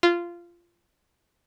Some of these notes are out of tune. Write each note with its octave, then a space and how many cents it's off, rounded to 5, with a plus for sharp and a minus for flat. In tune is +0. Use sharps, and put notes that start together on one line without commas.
F4 -15